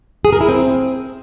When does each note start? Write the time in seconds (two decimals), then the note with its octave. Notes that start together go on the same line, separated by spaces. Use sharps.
0.25 G#4
0.33 A#4
0.41 E4
0.49 C4